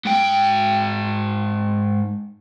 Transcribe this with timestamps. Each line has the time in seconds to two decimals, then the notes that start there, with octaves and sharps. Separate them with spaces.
0.05 G#2 G5